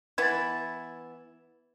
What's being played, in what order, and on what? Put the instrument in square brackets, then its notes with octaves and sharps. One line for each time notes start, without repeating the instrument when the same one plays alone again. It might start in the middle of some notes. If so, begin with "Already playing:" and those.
[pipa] E3 B3 E4 [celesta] G#6 A6